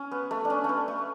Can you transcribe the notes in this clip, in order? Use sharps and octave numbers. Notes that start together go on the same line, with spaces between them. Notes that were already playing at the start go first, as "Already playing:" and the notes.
Already playing: C#4
B3
A3
D4
C#4
A3 B3
A3